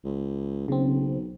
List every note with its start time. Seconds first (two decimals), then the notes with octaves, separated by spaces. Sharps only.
0.05 C#2
0.68 B1 C#3 C4